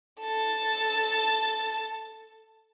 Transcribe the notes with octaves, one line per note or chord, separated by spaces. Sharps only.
A4 A6